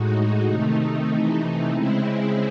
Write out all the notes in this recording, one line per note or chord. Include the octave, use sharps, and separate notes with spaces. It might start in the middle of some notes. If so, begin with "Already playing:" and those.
Already playing: A2 G#3 D#4 F#4
C3 D#3 A3 D#4
C3 E3 A3 D#4
C#3 G#3 C4 E4